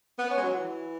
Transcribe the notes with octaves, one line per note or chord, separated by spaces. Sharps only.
B3
C#4
G#3
F#3
E3